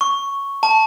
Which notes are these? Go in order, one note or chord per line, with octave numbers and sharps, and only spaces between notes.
C#6
A5